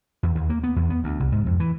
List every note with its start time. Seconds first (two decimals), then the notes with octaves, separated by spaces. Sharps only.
0.23 E2
0.35 D#2
0.49 A#3
0.64 B3
0.76 E2
0.90 B3
1.04 D2
1.20 C2
1.32 G#2
1.46 F2
1.60 E3